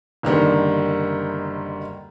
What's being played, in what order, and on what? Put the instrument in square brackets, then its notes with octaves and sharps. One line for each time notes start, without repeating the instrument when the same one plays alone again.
[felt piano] F#1 D3 D#3 G3